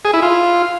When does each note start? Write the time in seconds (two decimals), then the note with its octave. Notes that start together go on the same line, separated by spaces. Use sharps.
0.05 G#4
0.14 E4
0.22 F4